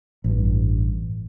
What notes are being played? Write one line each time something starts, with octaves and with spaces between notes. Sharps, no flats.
A1 G2